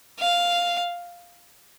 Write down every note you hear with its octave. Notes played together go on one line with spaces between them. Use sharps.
F5